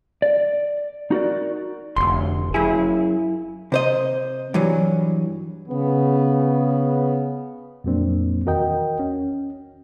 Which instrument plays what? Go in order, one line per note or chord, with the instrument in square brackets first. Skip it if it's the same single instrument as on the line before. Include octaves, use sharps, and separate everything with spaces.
[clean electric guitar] D5
D#4 F#4 A#4 D5
[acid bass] F1 [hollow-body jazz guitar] D2 C6
[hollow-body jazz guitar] F#2 G#4 [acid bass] E4
[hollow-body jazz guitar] C3 C5 D#5
G2 E3 F#3
[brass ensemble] C#3 B3
[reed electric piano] F2 A#2 F#3 A#3 C4 D4
E2 D#3 F#4 A#4 D#5 G5
C#4